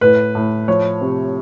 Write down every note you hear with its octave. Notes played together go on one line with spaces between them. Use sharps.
A2 B4
A2
F3 C#5
C3